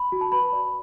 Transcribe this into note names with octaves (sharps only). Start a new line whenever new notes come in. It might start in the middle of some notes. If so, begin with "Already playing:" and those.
Already playing: B5
F#4
A5
B4 B5
D5